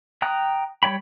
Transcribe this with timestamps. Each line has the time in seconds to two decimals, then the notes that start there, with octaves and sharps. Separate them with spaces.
0.22 G5 A#5 D#6 F#6
0.83 G3 C#5 G5 B5